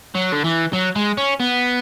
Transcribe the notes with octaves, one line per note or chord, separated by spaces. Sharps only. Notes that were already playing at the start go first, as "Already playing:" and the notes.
F#3
D3
E3
F#3
G#3
C#4
B3